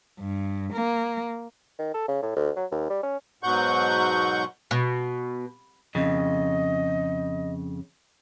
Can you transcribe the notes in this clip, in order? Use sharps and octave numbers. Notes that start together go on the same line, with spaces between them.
G2
A#3
D#3
A4
C#3
A2
D2
F#3
D#2
G3
C#4
G#2 B2 F#3 F#5 C#6 G6
B2
F2 C#3 D#5